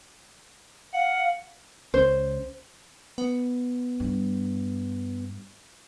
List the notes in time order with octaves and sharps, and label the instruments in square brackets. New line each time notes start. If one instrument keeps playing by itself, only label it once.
[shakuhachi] F5 [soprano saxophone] F#5
[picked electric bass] C#2 C#4 [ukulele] C5
[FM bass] B3
[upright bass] G2